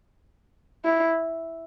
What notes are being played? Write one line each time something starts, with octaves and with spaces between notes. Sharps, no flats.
E4